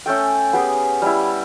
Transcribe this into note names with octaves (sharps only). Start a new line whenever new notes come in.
A3 C#4 A4 G5
B3 G4 G#4
G3 E4